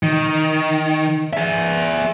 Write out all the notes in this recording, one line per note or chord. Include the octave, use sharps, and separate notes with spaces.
D#3
G#4 E5